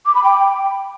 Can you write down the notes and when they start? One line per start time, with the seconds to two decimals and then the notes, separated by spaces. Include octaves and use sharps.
0.06 D6
0.15 B5
0.24 G5